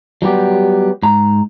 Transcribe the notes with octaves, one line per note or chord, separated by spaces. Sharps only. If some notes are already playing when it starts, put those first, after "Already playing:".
F#3 G3 B3 G4
G#2 A#5